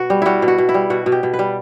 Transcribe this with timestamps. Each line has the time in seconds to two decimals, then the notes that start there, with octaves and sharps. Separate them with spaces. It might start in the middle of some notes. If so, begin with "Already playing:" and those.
Already playing: B2 F#4
0.10 G3
0.22 G3 E4 F#4
0.42 B2
0.48 F#4
0.58 B2
0.69 E4
0.74 G3
0.90 B2 F#4
1.06 B2
1.12 G4
1.23 B2
1.33 B4
1.39 G3